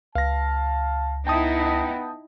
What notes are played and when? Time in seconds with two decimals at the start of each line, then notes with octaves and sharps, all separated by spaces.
0.15 C#2 F5 A5 A#6
1.27 B3 D#4 E4 G5 A5 D#6